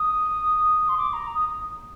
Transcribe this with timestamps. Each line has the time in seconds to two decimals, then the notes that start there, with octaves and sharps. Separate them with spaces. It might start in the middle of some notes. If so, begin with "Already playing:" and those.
Already playing: D#6
0.89 C6
0.98 D6
1.13 A#5
1.35 D#6